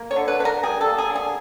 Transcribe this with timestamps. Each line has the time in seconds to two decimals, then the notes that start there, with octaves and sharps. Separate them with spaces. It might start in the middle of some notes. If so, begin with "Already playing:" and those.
Already playing: A#3
0.11 C#5
0.16 D3
0.28 B4
0.39 D3 B4
0.45 A#4
0.63 G3 G#4
0.81 A4
0.86 A#3
0.98 G#4
1.10 D3
1.16 G#4